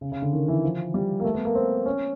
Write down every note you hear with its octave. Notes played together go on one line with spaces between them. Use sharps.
C#3
C#3
D3
D#3
E3
F3
G3
A#3
A3
B3
A#3
C4
C#4